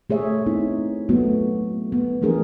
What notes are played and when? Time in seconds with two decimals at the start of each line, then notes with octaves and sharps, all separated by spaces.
0.10 A3 G#4 C#5 E5
0.46 B3 C4 D#4 E4
1.09 F#3 A3 B3 F#4
1.92 B3
2.22 E3 F3 A3 D4 G#4 A#4